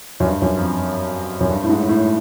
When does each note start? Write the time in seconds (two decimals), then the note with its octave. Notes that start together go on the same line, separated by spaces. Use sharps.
0.20 F#2
0.26 G2
0.42 F#2
0.57 F2
1.41 F#2
1.49 G2
1.64 A2
1.69 G#2
1.89 A2